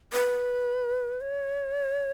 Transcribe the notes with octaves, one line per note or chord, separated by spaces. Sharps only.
B4
C#5